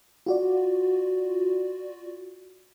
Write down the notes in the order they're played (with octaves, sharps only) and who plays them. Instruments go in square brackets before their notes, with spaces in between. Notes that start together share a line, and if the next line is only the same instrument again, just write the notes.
[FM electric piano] F4 F#4 D5